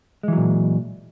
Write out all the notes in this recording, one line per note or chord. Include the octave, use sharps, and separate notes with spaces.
A#2 E3 F#3 G#3